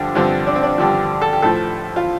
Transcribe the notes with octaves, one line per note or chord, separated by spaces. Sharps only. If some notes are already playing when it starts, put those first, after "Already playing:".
Already playing: G2 D3 F3 D4 G4
G2 D3 F3 C4
D4
C4
D4
G2 D3 F3 G4
A4
G4
A2 F3 A4
F4